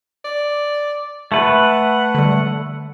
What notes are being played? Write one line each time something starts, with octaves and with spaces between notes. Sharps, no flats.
D5
A3 B4 F#5
D3 G3